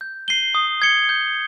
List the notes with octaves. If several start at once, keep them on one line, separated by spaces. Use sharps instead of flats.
G6
C7 D#7 G7
D#6
G#6 C#7 G7
G6